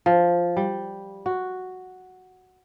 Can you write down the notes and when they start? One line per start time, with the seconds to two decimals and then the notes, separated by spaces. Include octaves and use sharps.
0.06 F3
0.57 G3
1.26 F#4